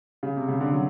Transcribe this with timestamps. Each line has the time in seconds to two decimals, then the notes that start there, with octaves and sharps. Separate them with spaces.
0.23 C#3
0.36 C3
0.48 C#3
0.60 D3
0.72 F#3